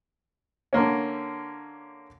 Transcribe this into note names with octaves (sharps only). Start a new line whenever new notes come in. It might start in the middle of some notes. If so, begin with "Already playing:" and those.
D3 A#3 C#4